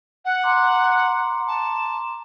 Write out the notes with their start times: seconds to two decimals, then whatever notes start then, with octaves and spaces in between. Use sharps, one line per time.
0.24 F#5
0.43 A#5 C6 D6
1.47 A5